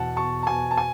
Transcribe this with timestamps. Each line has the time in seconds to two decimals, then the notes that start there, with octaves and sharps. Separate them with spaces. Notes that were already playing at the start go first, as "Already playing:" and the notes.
Already playing: E2 B2 F#5 A5
0.16 B2 A5 C#6
0.43 A5
0.47 B2 G#5
0.71 A5
0.77 G#5